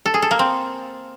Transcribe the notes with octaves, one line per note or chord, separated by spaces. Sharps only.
A4
G#4
A4
A#3
C4